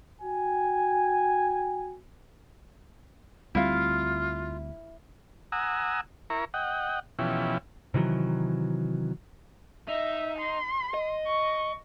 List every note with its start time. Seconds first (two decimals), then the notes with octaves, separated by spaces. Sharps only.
0.22 F#4 G5 G#5
3.55 D2 G3 C4 E4 F4 F5
5.52 F#5 G#5 A#5 D#6 E6
6.30 E4 A#4 A#5 C#6
6.54 D#5 F#5 G5
7.19 B2 E3 F3 C#4 E4 G4
7.94 C3 D#3 E3 F#3
9.88 D#4 E5
10.39 C6
10.94 D#5
11.27 C#6